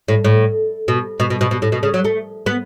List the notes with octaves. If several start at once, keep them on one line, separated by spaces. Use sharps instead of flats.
A2
A2
B2
B2
B2
B2
B2
A2
B2
C#3
F#3
A3
B3